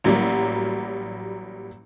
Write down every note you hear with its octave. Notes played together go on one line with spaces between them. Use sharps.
A1 F#3 G3 A#3